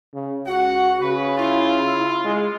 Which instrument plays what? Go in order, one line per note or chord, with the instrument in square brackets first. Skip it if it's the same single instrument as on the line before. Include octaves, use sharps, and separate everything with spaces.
[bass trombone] C#3
[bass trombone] C#2 [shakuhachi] F#4 [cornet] F#5
[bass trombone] C#3 [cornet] B4
[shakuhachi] E4 [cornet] F4
[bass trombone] G#3